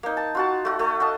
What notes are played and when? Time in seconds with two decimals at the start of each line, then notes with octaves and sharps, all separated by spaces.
0.03 A#3 D#4
0.17 A5
0.35 F4 F#4 A5
0.65 A3 F#4
0.79 A3
1.00 D#5 F5 A5